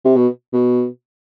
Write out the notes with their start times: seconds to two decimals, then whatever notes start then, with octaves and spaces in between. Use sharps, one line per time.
0.05 C3
0.16 B2
0.53 B2